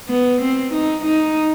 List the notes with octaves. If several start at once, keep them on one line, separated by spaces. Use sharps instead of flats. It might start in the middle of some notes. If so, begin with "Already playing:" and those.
B3
C4
D#4
D#4